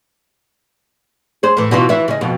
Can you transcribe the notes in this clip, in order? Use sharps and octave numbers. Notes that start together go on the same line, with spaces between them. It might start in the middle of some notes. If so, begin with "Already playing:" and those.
G#4 C5
A2 E3
B2 E3 F4
E3 E4
C#3 D#4
F2 B2